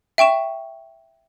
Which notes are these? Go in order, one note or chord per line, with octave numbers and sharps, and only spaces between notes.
E5 G5 C#6 E7